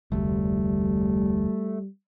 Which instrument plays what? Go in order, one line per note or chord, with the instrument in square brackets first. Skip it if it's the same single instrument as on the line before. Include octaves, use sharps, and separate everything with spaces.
[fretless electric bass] F1 D2 [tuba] G3 [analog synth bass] A3